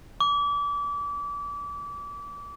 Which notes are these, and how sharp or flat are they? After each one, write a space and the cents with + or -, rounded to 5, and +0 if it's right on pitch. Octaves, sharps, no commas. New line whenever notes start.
D6 -30